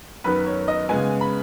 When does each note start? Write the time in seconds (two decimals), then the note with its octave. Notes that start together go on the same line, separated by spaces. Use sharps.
0.24 F#2 D#3 B3 B4
0.46 C#5
0.68 D#5
0.89 C#3 G#3 B3 G#5
1.21 B5